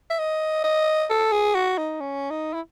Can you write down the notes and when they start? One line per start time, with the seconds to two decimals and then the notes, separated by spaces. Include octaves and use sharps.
0.10 E5
0.19 D#5
0.64 D#5
1.10 A4
1.32 G#4
1.55 F#4
1.78 D#4
2.01 C#4
2.30 D#4
2.54 E4